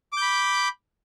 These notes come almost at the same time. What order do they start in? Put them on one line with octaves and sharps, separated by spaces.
D6 G6 B5